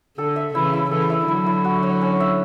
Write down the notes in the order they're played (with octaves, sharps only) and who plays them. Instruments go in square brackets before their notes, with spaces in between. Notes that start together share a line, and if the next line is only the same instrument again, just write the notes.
[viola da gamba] D3 [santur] A4
[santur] E5
[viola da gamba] C#3 E3 [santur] E4
[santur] E4
[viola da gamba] C#3 E3 [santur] A4
[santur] E5
[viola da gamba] D3 F#3 [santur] E4
[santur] E4
F#4
C#5
C#4
E5